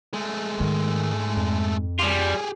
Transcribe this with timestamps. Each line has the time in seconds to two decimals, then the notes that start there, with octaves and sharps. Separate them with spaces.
0.14 G#3 A3
0.60 G#2 D#3
1.37 F2
2.00 G3 F4 G4 G#4